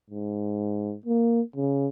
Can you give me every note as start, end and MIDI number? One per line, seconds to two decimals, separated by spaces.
0.11 0.94 44
1.06 1.41 58
1.56 1.87 49